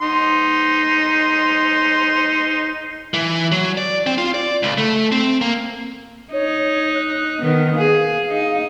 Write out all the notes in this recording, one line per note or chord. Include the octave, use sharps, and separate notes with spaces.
D#4 C6
E3
F#3
D5
C4
F4
D5
C#2
A3
C4
A#3
D#4 C#5
F#6
D#3 B3
G#4 F5
D#4